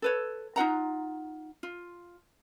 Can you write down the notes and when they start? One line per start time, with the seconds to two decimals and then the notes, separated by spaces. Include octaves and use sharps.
0.02 A4 B4 C#5
0.56 D#4 F4 F#5 A#5
1.63 F4